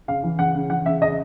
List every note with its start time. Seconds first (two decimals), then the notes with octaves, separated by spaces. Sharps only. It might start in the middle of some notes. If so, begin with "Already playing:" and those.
0.08 C#3 F5
0.23 E3
0.39 C#3 F#5
0.55 C#3
0.70 E3 F#5
0.86 C#3 E5
1.01 C#3 D#5